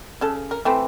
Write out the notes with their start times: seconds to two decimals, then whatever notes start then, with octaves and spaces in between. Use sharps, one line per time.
0.21 C#3 A4
0.51 A#4
0.65 E3 A3 C4